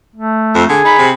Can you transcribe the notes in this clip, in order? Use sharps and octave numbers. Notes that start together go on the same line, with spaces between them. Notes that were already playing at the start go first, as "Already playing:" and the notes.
A3
F2
D3 G#4
D#4 B5
C3